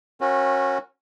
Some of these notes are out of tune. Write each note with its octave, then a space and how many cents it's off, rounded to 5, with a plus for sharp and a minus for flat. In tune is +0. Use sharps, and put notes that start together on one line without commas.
C#4 -30 F#4 -20 A#4 +0